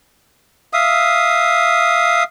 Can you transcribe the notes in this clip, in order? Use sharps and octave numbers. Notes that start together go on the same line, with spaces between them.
E5 F5 D#6